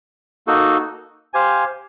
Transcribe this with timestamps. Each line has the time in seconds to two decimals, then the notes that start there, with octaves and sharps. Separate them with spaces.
0.47 A#3 D#4 F#4 A4
1.34 G4 C5 F5 G#5